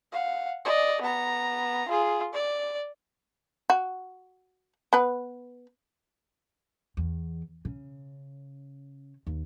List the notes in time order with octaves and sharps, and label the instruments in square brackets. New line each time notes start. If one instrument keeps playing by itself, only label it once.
[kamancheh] F5 F#5
D5 D#5
B3 A#5
F4 G#4
D5
[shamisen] F#4
B3 B4
[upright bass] E2
C#3
D#2